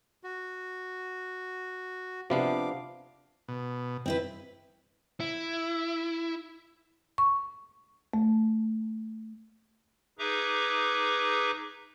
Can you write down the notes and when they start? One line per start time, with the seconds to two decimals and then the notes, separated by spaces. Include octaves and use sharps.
0.24 F#4
2.30 C3 F3 B3 D4 G4 F5 D6
3.48 B2
4.06 C4 E4 B4
5.20 E4
7.18 C#6
8.14 A3
10.19 D#4 G#4 B4 E5 A#5 D6